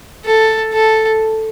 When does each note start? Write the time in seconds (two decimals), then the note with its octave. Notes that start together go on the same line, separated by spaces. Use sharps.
0.25 A4
0.73 A4